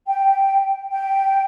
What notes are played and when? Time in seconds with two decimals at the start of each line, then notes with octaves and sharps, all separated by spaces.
0.07 G5
0.90 G5